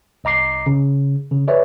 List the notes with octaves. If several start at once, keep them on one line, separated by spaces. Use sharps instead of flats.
C2 D#5 A#5 D6 C7
C#3
C#3
G#4 B4 C#5 D5 E5